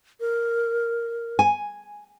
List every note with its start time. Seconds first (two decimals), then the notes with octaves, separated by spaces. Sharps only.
0.20 A#4
1.39 G#5